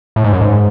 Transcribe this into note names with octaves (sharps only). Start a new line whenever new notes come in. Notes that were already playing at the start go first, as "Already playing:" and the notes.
A2
G#2
F#2
G#2